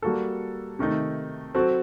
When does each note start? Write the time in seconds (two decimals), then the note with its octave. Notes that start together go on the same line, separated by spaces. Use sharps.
0.02 G3 A#3 F#4 A4
0.79 C3 D#3 A3 D#4
1.54 F#3 C4 F#4 A4